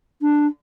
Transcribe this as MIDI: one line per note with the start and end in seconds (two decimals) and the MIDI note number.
0.22 0.47 62